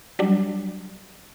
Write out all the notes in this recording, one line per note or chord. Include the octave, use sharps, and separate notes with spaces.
F#3 G3 D4